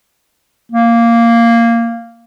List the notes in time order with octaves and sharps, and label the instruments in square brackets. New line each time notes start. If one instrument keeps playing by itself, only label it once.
[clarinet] A#3